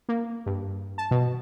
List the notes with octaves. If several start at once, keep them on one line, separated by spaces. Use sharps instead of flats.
A#3
G2
A5
B2